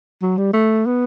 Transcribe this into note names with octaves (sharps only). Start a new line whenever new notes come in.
F#3
G3
A3
B3